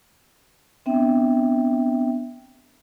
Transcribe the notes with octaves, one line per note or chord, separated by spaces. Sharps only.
B3 C4 D4 E5 G5